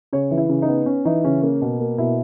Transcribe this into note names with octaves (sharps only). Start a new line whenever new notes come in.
C#3 C#5
E3
E4
C#3
D#4
B3
C#4
E3 D#4
C#3 C#4
A#3 C#4
B2
A#3
B2 E4